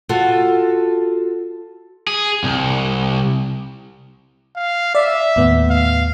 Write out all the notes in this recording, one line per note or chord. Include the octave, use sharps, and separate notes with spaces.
F4 F#4 A4
G#4
C2
F5
D5 E5
D#2 A2 B3
F5